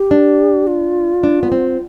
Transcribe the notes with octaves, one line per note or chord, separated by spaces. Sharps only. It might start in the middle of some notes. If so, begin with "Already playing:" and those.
Already playing: G4
D4
F4
D4
B3
C4